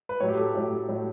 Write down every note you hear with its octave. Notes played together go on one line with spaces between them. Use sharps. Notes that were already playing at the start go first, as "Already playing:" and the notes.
B4
A2 F#3 C#5
G4
A4
A2 F#3
A2 F#3